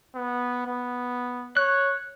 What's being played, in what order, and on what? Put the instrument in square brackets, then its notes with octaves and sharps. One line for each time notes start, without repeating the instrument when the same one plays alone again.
[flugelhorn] B3
B3
[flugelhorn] C#5 [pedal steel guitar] F#6